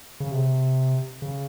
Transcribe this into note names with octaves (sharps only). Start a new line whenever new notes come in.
C#3
C3
C#3